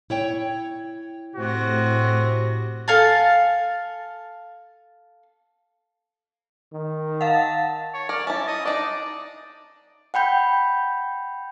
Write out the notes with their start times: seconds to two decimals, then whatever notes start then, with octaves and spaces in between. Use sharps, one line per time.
0.10 E4 C#5 G5
1.36 A2 C3 F#4 A#6
2.88 A4 F5 G#5 A5
6.73 D#3
7.21 F5 F#5 A5
7.94 C#5
8.09 A#4 D5
8.27 C#4 E4 A5
8.47 D#5
8.65 D4 D#4 D5
10.14 F#5 G5 B5 G6